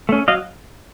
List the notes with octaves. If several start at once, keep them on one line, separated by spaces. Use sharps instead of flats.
A3 C#4
F#3 D#5 F5